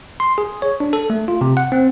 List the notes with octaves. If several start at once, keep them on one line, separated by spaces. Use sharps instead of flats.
C6
G#4
C#5
D4
A4
A3
F4
C3
F#5
C4